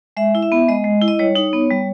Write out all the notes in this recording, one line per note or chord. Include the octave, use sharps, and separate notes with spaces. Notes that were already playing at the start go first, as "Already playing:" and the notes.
G#3 E5
E4
E5
B3
G#3 D#5
G#3
E4
D#5
G3 C#5
D#4
B3
G3